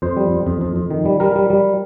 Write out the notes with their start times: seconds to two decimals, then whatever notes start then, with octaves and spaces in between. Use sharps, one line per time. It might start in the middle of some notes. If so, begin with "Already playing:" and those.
0.02 F2 C5
0.17 G3
0.32 F2
0.47 F2
0.61 F2
0.76 F2
0.90 D#3
1.06 G3
1.20 G3 A#4
1.36 G3
1.50 G3